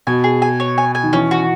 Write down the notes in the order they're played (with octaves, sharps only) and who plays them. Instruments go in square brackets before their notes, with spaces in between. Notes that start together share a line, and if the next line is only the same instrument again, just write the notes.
[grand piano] B2 [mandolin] G#5
[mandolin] G#4
G#5
C#5
G#5
G#5
[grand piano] D#3
[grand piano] E3 [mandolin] C#4
[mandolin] F#4